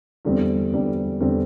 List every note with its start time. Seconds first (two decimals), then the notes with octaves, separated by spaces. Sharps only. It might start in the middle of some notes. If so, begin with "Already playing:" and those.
0.25 E2 D3 G3 C4
0.72 E2 D3 G3 C4
1.20 E2 D3 G3 C4